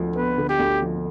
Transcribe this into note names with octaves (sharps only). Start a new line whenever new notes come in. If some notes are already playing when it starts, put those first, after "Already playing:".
Already playing: D2 D3 F3
B3 B4
D3
G4
D2
F3